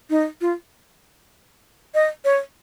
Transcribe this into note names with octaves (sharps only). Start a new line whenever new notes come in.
D#4
F4
D#5
C#5